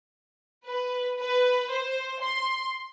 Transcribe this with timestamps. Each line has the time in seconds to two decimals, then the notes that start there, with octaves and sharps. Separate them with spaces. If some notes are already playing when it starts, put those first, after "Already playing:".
0.66 B4
1.19 B4
1.71 C5
2.21 C6